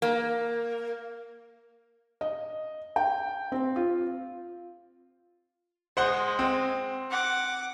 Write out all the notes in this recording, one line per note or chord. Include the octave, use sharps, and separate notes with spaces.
A#3
D#5
G5
C4
F4
G#3 C5 F#5 C6
C4
F#5 D6